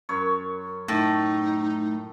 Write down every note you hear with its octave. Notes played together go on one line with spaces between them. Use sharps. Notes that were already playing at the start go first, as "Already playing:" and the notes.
F#2 C#5
A2 A3 D#4